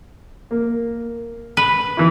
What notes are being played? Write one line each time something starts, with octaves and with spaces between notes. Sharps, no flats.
A#3
B4
E3 E4